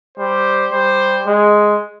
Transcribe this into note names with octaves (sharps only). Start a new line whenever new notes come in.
G3 C5
G3 C5
G#3